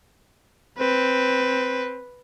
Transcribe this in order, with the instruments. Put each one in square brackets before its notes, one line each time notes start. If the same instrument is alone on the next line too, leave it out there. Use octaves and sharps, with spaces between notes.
[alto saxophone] C4 [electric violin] B4